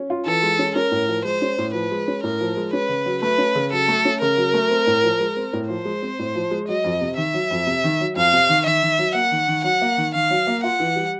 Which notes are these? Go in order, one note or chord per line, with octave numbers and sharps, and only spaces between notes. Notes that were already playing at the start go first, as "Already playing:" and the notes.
Already playing: C#4
F4
E3 A4
G#3
C#4
C#4 A#4
A2
F3
G#3 C5
C#4
A2
F3 B4
G#3
C#4
A2 A#4
F3
G#3
C#4 B4
C#3
F#3
A3 B4
C#4
C#3
F#3 A4
A3
C#4
C#3 A#4
F#3
A3
C4
A2
F3
G#3
C4
A2
F3 C5
G#3
C4
A2
F3
G#3
F#3 D#5
F2
C3
D#3 E5
F#3
F2
C3
D#3
F#3
F2 F5
C3
D#3
D#3 E5
D#3
F#3
A#3 F#5
D#3
D#3
F#3 F#5
A#3
D#3
D#3 F5
F#3
A#3
F4 F#5
E3
G3